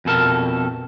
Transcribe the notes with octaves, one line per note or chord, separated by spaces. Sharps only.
F2 B2 A4 A#4 A5